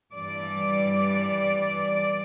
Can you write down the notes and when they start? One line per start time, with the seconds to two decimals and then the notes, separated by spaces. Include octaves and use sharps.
0.16 G2 E3 G3 D5